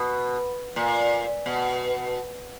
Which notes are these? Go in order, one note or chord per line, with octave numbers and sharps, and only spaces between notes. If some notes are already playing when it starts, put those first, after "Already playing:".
Already playing: B2
A#2
B2